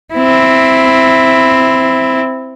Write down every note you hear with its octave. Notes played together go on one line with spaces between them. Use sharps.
C4 E4